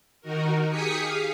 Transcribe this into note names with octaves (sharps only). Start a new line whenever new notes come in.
D#3 D#4 F#4 A#4
G4 G#4 G#5 D#6 B6 C#7
F5